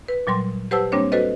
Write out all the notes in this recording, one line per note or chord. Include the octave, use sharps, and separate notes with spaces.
B4
A#2 F#3 G3 C6
G4 B4 C5 F#5 A5 E6
G3 A#3 C4 D4 C5 C#5
F#4 A4 B4 C5 D#5